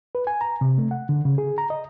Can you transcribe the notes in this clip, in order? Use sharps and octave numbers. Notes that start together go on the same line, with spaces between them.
B4
G#5
A#5
C3
A3
F#5
D3
C#3
G#4
A#5
D#5